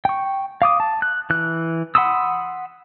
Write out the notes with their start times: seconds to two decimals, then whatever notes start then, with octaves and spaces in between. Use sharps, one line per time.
0.05 G5 C#6
0.62 F5 D6 D#6
0.80 A5
1.02 F#6
1.30 E3 F#6
1.95 F#5 B5 C6 D#6 E6